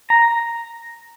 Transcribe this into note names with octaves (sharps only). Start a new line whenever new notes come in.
A#5